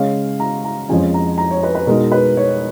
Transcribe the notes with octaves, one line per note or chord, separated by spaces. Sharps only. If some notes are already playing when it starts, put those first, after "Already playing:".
Already playing: C#3 G#3 C#4 F5
A#5
A#5
F2 F3 G#3 C#4 G#5
A#5
A#5
C#5
B4
B4
B2 G#3 D#4 A#4
B4
C#5